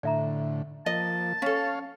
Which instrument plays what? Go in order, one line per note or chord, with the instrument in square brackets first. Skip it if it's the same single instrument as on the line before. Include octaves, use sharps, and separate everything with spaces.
[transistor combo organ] A2 D3 [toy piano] D5 E5 A#5
[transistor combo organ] F3 A#3 [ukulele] D#5 [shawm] A5
[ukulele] C#4 A4 [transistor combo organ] C#5 F5